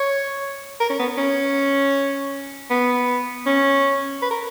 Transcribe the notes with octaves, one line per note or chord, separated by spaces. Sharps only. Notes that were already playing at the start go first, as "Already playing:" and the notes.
Already playing: C#5
A#4
C#4
B3
C#4
B3
C#4
B4
A#4